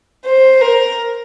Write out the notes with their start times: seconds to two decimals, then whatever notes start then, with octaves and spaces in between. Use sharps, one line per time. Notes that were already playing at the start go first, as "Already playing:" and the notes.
0.25 C5
0.61 A#4